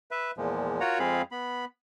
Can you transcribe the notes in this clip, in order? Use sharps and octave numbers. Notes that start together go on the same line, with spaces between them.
B4 E5
E2 A#2 F3 G#3
F4 F#4 A#4 C#5 F#5 A#5
F2 G#3 C4 G#4 F5 B5
B3 B5